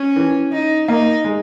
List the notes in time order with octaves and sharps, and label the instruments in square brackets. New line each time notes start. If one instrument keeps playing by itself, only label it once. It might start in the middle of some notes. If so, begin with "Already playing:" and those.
Already playing: [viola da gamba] C#4
[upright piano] E3
[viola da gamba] D#4
[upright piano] A#3 [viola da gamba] D#4
[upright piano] G#3